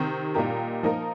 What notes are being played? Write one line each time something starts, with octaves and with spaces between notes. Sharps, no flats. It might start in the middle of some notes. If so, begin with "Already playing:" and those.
Already playing: C3 D#3 C4 G4
A#2 G3 D#4 G4 A#4
F3 A#3 D#4 A#4